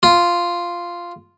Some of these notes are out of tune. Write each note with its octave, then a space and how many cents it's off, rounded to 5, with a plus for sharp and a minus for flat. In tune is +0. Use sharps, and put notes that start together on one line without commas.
F4 -5